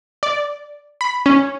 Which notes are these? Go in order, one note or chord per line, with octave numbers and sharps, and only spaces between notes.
D5
B5
C#4